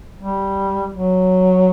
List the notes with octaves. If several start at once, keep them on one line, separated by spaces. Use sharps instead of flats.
G3
F#3